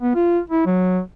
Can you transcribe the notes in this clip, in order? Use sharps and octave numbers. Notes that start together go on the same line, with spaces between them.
B3
F4
E4
F#3